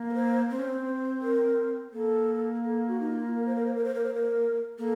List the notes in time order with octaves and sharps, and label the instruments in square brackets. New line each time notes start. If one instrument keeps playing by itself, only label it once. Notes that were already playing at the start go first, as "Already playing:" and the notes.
Already playing: [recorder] A#3
[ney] A#4
C5
[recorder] C4 [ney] C5
[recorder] C#4
C4
[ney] C5
A#4
[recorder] A#3 [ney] A4
[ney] A4
F#4
D#4
F4
A#4
C5
A#4
C5
A#4
C5
A#4
C5
A#4
[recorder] A#3 [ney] A4